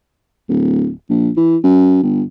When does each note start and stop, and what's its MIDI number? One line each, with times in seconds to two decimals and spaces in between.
0.49 0.90 26
1.10 1.30 34
1.37 1.57 52
1.64 1.99 42
2.03 2.22 31